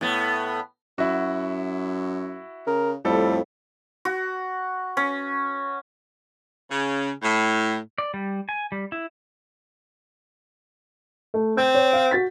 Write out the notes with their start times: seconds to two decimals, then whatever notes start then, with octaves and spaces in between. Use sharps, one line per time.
0.01 A2 B3
0.98 F#2 E4 F#4
2.67 C#3 A#4
3.05 F2 A2 G3 A4
4.05 F#4
4.97 C#4
6.70 C#3
7.22 A2
7.98 D5
8.14 G3
8.49 G#5
8.72 G3
8.92 E4
11.34 A3
11.57 C4 G6
11.75 C#5
11.93 F5
12.11 F#4 A6 B6